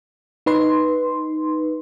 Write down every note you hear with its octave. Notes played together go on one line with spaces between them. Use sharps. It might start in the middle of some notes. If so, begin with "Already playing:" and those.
D#4 B4 C6